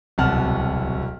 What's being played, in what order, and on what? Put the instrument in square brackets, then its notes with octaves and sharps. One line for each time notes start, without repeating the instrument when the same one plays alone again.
[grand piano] D1 C2 B2 F#5 A5 F6